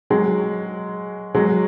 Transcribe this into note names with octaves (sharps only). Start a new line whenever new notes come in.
F#3 G#3
F#3 G#3